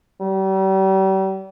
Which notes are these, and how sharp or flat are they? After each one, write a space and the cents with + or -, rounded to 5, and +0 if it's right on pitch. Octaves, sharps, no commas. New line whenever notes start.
G3 -40